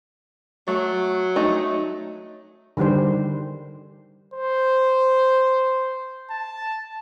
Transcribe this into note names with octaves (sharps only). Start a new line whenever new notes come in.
F#3 A3
A3 D#4
D3 D#3 G3 G4 C5
C5
A5